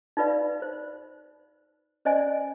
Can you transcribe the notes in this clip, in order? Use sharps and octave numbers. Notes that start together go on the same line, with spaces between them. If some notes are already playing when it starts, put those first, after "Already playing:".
D#4 F4 B4 D5 F5
C5
C#4 C5 D5 D#5 G#5